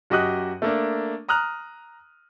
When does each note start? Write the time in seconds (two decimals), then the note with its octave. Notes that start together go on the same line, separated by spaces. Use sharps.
0.10 F#2 F#4 G4 D#5 D#6 F#6
0.62 A3 A#3 D4
1.29 A#5 D#6 F6 F#6